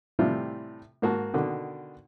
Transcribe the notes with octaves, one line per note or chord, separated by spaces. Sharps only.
A2 C3 E3 G3 E4 F4
G#2 A#3 F#4 A5
B2 D3 D#3